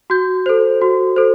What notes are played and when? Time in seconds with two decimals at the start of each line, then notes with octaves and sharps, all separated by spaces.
0.10 F#4 G6
0.46 A4 C5
0.81 F#4
1.16 A4 C5